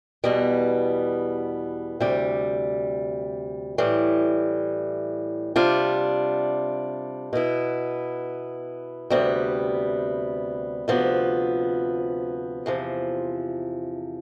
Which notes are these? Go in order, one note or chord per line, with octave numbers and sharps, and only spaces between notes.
E2 B2 G3 B3
D2 C3 G3
A2 E3 G3
C3 G3 D4 F4
B2 B3 E4
D2 C3 G3 B3
D2 C3 F3 B3
E2 C3 F3